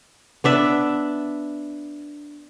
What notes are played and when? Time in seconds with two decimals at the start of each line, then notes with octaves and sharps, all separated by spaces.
0.44 B3 D4 E5